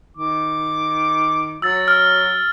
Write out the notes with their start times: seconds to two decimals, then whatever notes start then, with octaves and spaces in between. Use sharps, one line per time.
0.17 D#3 D6
1.62 F#3 E6 A6
1.88 F6